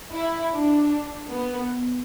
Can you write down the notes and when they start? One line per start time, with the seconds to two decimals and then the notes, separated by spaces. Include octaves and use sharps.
0.12 E4
0.52 D4
1.32 B3